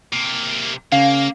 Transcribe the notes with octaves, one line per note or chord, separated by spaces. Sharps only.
C3 A#3
C#3 A#3 F5